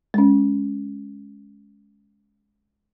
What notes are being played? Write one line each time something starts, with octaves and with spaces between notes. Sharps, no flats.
G#3 C#4